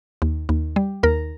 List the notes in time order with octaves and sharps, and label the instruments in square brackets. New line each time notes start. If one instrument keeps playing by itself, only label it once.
[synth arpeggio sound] D#2
D#2
G3
D#2 A#4